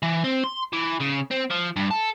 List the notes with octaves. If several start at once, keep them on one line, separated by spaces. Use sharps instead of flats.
E3
C4
C6
E3
C#3
C4
F3
G2
A4